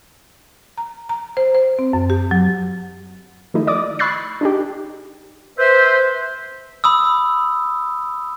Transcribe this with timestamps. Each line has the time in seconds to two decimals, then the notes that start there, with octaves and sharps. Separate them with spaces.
0.78 A#5
1.09 A#5
1.37 C5
1.55 C5
1.79 C4
1.93 F#2
2.10 G4
2.31 F#3
3.54 D#3 F3 A3 D#4 E4
3.67 D5 D#5 D6 D#6
3.99 B5 C#6 E6 F#6 A6 C7
4.41 D4 D#4 G4
5.59 B4 C5 E5
6.84 B5 D#6 E6